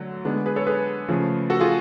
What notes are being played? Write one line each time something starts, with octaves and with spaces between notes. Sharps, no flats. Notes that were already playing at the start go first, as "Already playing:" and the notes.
Already playing: D3 F#3 A3
D3 G#3 B3 D4
G#4 B4
A4 C#5
G#4 B4
C#3 F3 A3
F#4 A4
F4 G#4